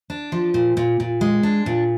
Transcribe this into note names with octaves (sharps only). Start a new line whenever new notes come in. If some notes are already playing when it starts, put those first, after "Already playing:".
D4
F3
A#2
A#2
A#2
G#3
D4
A#2